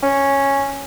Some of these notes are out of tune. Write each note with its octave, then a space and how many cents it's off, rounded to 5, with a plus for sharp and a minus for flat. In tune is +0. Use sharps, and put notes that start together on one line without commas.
C#4 -5